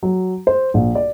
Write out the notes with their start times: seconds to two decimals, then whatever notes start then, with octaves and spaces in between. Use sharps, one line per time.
0.03 F#3
0.47 C5
0.74 A#1
0.95 D5